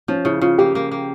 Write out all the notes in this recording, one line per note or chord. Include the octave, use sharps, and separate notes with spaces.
F3 C#4
C#3 E4
C#3 F4
A#3 G4
A#3
A#3